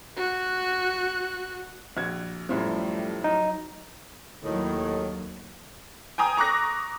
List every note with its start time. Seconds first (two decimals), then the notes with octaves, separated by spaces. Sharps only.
0.17 F#4 F#6
1.97 A#1 F#4 G#6
2.49 F#2 A2 F3 G3 A3
3.24 F#3 D#4
4.44 D#2 A2 D#3 F#3
6.18 G5 G#5 A#5 D#6
6.37 A#5 C#6 D6 F#6 A#6